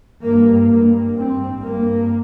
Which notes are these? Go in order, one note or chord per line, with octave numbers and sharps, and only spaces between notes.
G2 A#3
G2 A#3
G2 C4
G2 A#3